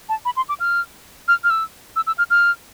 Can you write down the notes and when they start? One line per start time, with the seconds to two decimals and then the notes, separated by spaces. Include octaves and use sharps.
0.09 A5
0.25 B5
0.37 C6
0.49 D6
0.60 F6
1.28 F6
1.44 F6
1.50 E6
1.96 E6
2.07 E6
2.18 F6
2.30 F6